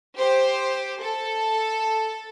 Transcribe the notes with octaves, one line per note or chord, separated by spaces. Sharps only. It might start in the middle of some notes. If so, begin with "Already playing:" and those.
G4 C5
A4